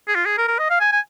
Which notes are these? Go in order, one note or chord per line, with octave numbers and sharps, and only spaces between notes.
G#4
F4
G#4
A#4
A#4
D#5
F5
G#5
G#5